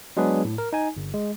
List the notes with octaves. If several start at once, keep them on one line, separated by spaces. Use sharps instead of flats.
F#3 G#3 B3 D4 G#4 B4
A2
A#4
D#4 G#5
G1
G#3